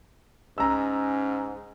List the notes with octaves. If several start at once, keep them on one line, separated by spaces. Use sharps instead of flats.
G#2 C#4 A#5 E6